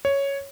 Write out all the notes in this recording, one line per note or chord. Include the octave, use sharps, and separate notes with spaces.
C#5